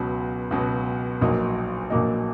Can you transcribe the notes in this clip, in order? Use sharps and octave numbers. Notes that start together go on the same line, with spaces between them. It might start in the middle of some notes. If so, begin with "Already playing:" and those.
Already playing: C#2 B2 F#3
C#2 B2 F#3
A#1 A#2 F#3 A#3 D#4
A#1 A#2 F#3 A#3 D#4